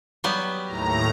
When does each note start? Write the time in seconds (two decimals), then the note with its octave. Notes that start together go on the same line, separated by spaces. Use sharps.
0.24 F#3 G3 B3
0.65 D#2 A2 A#5